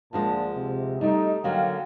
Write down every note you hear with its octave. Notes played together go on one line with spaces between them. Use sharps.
D2 A#2 F3 G#3 D4 A5
C3
G3 A3 D#4
D3 F#3 A#3 F5 G5